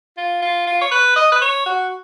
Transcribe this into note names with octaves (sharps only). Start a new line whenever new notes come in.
F4
F4
F4
C#5
B4
D#5
B4
C#5
F#4